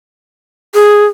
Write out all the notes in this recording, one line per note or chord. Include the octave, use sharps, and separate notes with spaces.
G#4